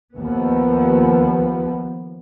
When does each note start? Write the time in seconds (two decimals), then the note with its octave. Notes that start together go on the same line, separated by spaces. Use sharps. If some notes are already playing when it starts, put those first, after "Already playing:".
0.16 D#2 F3 B3